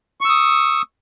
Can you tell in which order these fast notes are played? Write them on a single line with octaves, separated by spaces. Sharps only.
C#6 E6 D#6